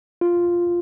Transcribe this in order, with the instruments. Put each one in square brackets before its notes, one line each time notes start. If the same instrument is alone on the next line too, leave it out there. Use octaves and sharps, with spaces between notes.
[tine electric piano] F4